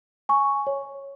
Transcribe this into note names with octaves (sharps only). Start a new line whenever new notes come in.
G#5 C#6
C#5